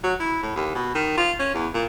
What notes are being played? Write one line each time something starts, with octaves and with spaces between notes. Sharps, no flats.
F#3
E4
A2
D#2
B2
D#3
F4
C#4
E2
A#2